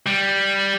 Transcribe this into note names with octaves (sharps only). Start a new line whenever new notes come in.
G3